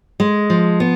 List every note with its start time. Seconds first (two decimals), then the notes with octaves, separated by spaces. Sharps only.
0.20 G#3
0.50 F3
0.80 B3